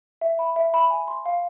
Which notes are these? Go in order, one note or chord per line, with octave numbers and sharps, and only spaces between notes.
E5
B5
E5
B5
G#5
C6
F5